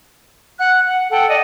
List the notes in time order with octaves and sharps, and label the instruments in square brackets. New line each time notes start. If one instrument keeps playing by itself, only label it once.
[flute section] F#5 F#6
F#5
A4 F#5 G5
D5 D#5